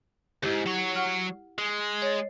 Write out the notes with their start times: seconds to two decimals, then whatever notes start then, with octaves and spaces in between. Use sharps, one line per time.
0.43 D2 G#2 E4 G4
0.66 F#3 C#5
0.96 F#5 F6
1.58 G#3
2.02 C#5 D#5 A6